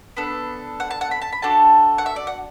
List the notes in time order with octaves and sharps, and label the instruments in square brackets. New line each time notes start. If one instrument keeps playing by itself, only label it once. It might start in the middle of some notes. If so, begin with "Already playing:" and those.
[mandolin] B3 D4 A4
F#5
A5
F#5
B5
A5
B5
D4 F#4 A4 A5
F#5
E5
D5
F#5